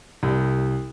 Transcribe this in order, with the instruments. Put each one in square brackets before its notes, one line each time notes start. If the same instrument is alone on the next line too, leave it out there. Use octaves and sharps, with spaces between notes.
[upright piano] C2